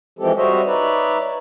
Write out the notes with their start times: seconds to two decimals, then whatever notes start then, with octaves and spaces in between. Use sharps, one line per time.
0.19 E3 F3 G#3 C4 G4 A4
0.37 G3 F#4 C5 C#5 D#5 E5
0.65 D#4 B4 C#5 D5 E5